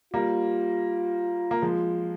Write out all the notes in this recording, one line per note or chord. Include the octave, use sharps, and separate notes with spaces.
G3 A#3 F4
A#3
F3 G#3